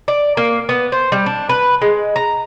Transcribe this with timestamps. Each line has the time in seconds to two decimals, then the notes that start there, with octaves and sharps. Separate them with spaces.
0.08 D5
0.37 A#3
0.69 B3
0.92 C5
1.12 G3
1.26 D4
1.49 B4
1.82 G#3
2.16 A#5